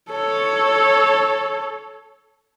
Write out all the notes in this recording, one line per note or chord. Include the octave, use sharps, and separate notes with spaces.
A4 C#5